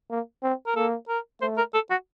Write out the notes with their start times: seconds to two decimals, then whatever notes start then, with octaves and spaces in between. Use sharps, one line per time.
0.10 A#3
0.43 C4
0.67 A#4
0.76 A#3 A4
1.08 A#4
1.41 A3 C5
1.57 A#4
1.74 A4
1.91 F#4